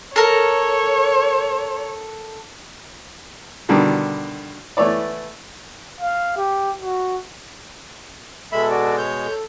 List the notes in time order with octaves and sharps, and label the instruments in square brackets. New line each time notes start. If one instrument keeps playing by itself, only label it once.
[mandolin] A4 A#4 [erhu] C#5
[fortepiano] B2 D3 D#3 G3
E3 A3 B3 C#5 D5
[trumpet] F5
G4
F#4
[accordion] B2 G#3 [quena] A4 [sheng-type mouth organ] E5 B5
[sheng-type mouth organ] F#4 D5
C#5 G6
[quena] A4